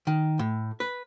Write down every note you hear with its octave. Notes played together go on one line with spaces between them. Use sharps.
D#3
A2
B4